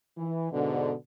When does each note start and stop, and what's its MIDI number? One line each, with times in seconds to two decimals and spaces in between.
0.17 0.51 52
0.52 0.94 44
0.52 0.94 47
0.52 0.94 50